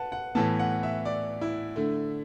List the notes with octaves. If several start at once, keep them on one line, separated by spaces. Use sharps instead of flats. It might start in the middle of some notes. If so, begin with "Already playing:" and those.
Already playing: B4 F#5 A5
F#5
A2 E3 B3 A5
F#5
E5
D5
E4
D3 A3